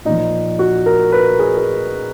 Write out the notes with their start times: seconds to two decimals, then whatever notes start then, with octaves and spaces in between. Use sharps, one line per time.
0.05 A#2 D#4
0.10 F3
0.59 F#4
0.86 A#4
1.12 B4
1.39 G#4
1.58 G#4